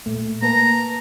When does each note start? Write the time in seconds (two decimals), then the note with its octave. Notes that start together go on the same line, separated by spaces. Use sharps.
0.06 A#2 A3
0.42 A#3 B4 A5 A#5